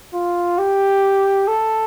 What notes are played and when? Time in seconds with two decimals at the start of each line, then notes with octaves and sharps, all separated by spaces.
0.14 F4
0.59 G4
1.48 A4